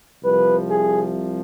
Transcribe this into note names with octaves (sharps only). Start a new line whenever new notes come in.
C2 C3 F3 B4
G#4